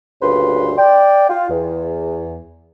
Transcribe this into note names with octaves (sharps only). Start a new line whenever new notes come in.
D2 G2 A#2 C#3 B4 C6
D5 G5
F4
E2